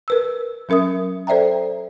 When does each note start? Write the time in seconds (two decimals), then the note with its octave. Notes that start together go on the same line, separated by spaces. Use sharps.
0.08 A#4 B4 E6
0.69 F#3 C#4 A#4 E5 D#6
1.27 A4 C5 D5 E5 G5 A#5